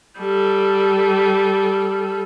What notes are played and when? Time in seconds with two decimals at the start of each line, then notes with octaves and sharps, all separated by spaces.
0.19 G3 A4